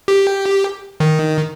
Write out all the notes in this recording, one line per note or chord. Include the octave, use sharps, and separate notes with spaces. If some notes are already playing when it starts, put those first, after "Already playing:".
G4
D#3